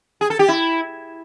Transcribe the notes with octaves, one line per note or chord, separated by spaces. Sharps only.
G#4
A4
G4
E4